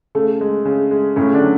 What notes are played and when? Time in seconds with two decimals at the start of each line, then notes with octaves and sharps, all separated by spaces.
0.15 C#3 A3
0.41 G#3
0.65 C#3
0.91 G#3
1.16 A2 C#3 C#4
1.33 D3 D4
1.42 F#3